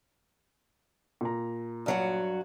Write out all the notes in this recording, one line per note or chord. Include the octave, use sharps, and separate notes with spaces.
A#2 A#5
G2 F#3 F#4